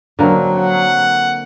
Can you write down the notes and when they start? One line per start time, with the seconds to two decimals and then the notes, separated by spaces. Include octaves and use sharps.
0.19 D3 F#3 A#3 C4
0.56 F#5